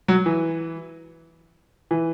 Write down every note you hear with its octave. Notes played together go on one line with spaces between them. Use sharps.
F#3
E3
E3